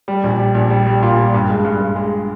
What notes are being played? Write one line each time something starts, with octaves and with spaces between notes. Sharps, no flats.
G3
A#1
G3
A#1
G3
G3
A#2
G3
G2
G#3
G2
G2
G#3